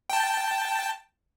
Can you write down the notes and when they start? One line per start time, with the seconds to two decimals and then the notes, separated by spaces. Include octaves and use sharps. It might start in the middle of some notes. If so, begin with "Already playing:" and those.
0.10 G5 A5